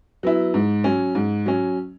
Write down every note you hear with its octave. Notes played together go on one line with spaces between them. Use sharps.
F#3 B3 E4
G#2
F#3 C#4
G#2
F#3 C#4